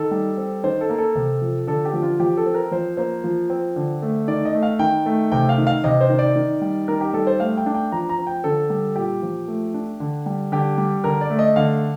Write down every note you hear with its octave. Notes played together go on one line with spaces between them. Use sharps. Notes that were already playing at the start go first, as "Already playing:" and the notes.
Already playing: D#3 A4
G3
C4
D#3 C5
A4
A#3
A4
C3
F3
D3 A4
G4
F3
F4
F3 G4
A4
C4
A#4
F3 C5
A#3 C5
F3
C4
D3
A3
D#3 D5
D#5
A3
F5
D#3 G5
A3
C3 G5
F5
D#3
F5
C3 D#5
C5
D#3
D5
D#3
G3
D#3 A#4
G4
G3 A4
C5
A3 F5
G5
D4
G5
F3 A#5
A#5
C4
G5
D3 A4
G3
A#2 G4
F3
A3
D4
D3
G3
D3 G4
G3
D3 A#4
D5
A3
D#5
D3 F5